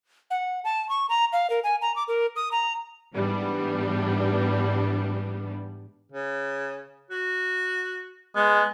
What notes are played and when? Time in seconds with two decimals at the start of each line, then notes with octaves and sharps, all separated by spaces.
0.31 F#5
0.64 A5
0.89 C#6
1.09 A#5
1.33 F5
1.50 A#4
1.64 G#5
1.82 A#5
1.96 D6
2.08 A#4
2.36 D#6
2.52 A#5
3.13 G#2 E3 G3 B3 D4
6.12 C#3
7.11 F#4
8.36 G#3 B3